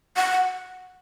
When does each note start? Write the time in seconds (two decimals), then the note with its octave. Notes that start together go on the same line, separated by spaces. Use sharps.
0.17 F#5